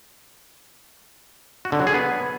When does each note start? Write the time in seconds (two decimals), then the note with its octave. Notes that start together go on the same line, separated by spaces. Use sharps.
1.65 F#4
1.72 D3
1.80 F#3
1.87 G#4
1.94 B3